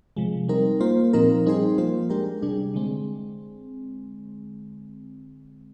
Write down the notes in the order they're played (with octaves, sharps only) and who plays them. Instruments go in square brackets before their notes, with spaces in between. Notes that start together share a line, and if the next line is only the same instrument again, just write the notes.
[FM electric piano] C3 F3 G#3
G3 C4 D#4 A#4
A#3 F4 C5
A#2 F3 C4 D#4 A#4
G3 C4 D#4 G#4 C5
F3 A#3 F4 C5
G#3 D4 G4 A#4
C3 G3 D4 G#4
D3 G#3 C4